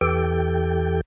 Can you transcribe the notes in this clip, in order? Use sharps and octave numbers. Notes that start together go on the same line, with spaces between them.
E2 E3 G4 A4 G5